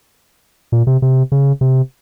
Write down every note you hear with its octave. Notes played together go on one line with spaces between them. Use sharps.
A#2
C3
C3
C#3
C3